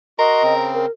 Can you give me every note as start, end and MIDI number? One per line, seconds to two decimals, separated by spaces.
0.19 0.43 66
0.19 0.72 70
0.19 0.54 75
0.19 0.43 84
0.43 0.86 49
0.43 0.86 60
0.74 0.91 70